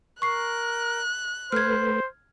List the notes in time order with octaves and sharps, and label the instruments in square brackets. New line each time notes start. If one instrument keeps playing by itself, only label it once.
[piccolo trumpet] A#4 [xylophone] C#6 C7 [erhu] F#6
[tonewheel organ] A3 B4 [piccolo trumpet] C5 [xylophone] F6 G#6